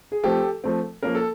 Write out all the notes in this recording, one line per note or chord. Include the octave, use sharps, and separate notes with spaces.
G#4
F3 A3 C4 G4 A4
F3 A3 C4
F3 A#3 C#4 A#4
A4